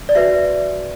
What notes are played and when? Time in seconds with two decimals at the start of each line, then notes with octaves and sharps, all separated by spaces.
0.09 D5
0.15 F#4 B4 E5